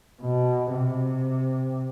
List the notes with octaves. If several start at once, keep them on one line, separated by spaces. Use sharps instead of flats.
B2
C3